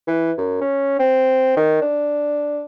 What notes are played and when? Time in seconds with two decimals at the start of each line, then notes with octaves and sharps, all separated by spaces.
0.07 E3
0.38 F#2
0.61 C#4
0.99 C4
1.57 D#3
1.82 D4